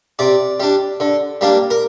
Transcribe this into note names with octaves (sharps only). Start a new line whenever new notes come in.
C3 D5
G3 D4
D3
G3 A#3 D4
A#4